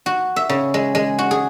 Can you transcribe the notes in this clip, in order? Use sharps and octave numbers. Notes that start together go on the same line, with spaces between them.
F#4
E5
C#3
G#3
G#3
F#4
G#4